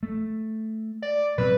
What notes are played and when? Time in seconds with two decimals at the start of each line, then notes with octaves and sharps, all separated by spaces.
0.03 A3
1.02 D5
1.38 B2 F#3 C4 B4